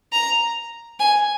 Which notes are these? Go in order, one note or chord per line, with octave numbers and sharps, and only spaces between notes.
A#5
G#5